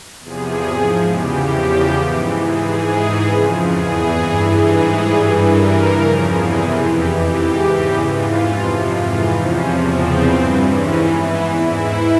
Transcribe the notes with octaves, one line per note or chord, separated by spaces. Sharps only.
E2 C3 F3 G#4
G#2 F3
E2 C#3 E3 G4
E2 C#3 F3
G#2 E3
G#2 E3 G#4
G#2
E3
F2 C#3 F3
E2 E3 G#4
G2 E3
G#2 E3 G#4
G2 E3
G2 E3 A#4
E2 C#3 F3
E2 C3 E3 G#4
F2 E3 G4
G#2 E3 G4
E2 C#3 E3
G#2 E3 F4
F2 C3 F3
G#2 E3 F4
E2 C3 F3 C#4
E2 C#3 F3 C4
G2 E3
G#2 E3 C#4
E2 E3 E4
G#2 E3 E4